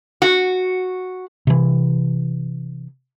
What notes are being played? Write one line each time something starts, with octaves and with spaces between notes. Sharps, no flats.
F#4
C3 E3